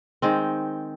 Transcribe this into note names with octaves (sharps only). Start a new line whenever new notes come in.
D#3 G#3 C4